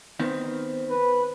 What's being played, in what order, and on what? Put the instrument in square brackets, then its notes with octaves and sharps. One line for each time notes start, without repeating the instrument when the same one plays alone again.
[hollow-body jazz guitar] D#3 B3 C4
[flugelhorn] B4